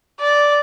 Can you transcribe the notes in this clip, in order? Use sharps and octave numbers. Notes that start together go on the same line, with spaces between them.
D5